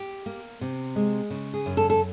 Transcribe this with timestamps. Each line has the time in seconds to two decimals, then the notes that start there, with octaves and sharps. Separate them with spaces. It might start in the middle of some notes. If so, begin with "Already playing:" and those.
Already playing: G4
0.26 A#3
0.61 C3
0.96 G#3
1.30 C#3
1.54 G#4
1.66 F#2
1.77 A4
1.90 A4